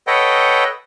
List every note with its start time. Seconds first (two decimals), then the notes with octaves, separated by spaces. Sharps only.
0.07 A4 B4 C#5 D#5 F#5 G5